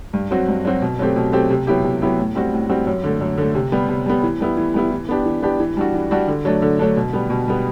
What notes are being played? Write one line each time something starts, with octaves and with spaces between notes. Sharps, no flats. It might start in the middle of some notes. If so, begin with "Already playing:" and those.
G2
F#3 C4 F#4
G2
F#3 C4 F#4
B2
F#3 A3 C4 G4
B2
F#3 A3 C4 G4
C3
F#3 B3 E4 G4
C3
F#3 B3 E4 G4
A2
G3 C4 F#4
A2
G3 C4 F#4
F#2
D3 A3
F#2
D3 A3
C3
G3 B3
C3
G3 B3
E3
G3 B3 E4
E3
G3 B3 E4
E3
B3 D4 G4
E3
B3 D4 G4
E3
G3 D4 F#4
E3
G3 D4 F#4
D3
F#3 A3 D4
D3
F#3 A3 D4
B2
G3 B3
B2
G3 B3